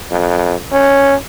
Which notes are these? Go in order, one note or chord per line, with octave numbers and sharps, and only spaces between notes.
F2
C#4